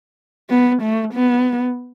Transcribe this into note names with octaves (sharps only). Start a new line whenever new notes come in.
B3
A3
B3